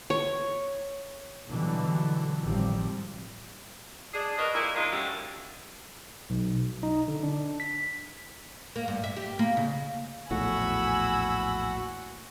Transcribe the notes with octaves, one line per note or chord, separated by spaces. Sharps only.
C#5
B2 D3 E3 F#3 G3
G#1 A2 F3 G3 C4
D4 G#4
F#4 A#4 B4 D#5
A#2 E4
D#3 G#3 D4 F4
F#2 A2 D3 G3
B1
D#4
D3
D4
B6
A#3
G2
E5
G4
A#3
C#3
A#1 E2 A2 F#4 G#5 B5 E6